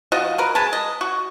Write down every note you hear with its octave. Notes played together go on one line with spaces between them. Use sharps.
F3 F#4 D#5
A#4 B4
G#3 B4 A5
D#5
F#4